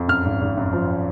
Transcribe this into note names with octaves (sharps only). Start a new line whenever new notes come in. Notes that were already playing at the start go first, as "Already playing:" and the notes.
Already playing: F2
F#2 F6
G#1
G#1
F#2
F3